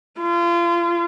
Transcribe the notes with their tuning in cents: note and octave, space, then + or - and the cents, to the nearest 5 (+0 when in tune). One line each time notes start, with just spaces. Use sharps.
F4 -30